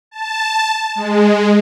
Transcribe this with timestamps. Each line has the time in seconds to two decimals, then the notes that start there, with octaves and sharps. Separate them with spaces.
0.11 A5
0.95 G#3